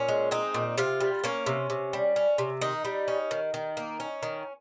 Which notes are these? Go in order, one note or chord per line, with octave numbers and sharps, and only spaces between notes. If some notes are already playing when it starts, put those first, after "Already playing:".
Already playing: A#2 C#4
G#3
C4 D#4
A#2
C3 F4
G3
A#3 C#4
C3
C3
G3
C#4
C3
D#3 D#4
G3
C#4
D#3
D#3
A#3
C#4
D#3